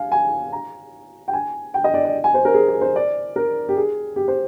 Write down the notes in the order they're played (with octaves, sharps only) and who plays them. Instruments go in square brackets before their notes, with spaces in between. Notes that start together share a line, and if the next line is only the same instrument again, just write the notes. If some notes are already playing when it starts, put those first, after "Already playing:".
Already playing: [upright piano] F5 G#5
G#5
A#5
G5
G#5
G5
D#5
D5
D5
G#5
C5
A#4
G#4
G#4
C5
D5
A#4
G4
G#4
G4
C5